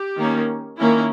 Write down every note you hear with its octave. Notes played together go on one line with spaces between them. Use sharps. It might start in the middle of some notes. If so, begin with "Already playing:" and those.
Already playing: G4
D#3 A#3 C#4
D#3 A#3 C#4 E4